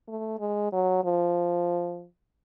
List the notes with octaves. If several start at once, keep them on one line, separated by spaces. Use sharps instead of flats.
A3
G#3
F#3
F3